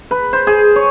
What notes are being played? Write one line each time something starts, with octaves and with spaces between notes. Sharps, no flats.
B4
C5
G#4
C#5